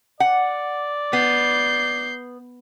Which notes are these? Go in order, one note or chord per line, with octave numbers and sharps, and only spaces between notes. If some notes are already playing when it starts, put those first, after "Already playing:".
D5 F#5
B3 G6 C7